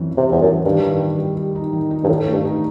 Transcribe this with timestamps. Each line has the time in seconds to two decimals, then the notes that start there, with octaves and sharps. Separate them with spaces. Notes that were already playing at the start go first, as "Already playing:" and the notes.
Already playing: F#2 E3 C4
0.11 E3
0.17 C3
0.29 E2 G3
0.41 F#2
0.48 E3
0.65 G2 D#3
0.83 D#3
1.00 G3
1.18 G3
1.37 G3
1.55 D#4
1.73 D#3
1.91 D#4
2.04 G2
2.08 A2 D#3
2.26 A3
2.33 G2
2.45 D#4